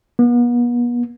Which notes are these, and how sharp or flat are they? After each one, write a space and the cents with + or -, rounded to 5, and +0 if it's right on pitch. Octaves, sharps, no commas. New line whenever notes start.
B3 -40